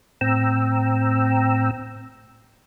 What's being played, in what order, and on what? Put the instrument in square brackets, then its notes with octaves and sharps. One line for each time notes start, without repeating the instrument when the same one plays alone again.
[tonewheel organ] A2 C4 G5 A#5 E6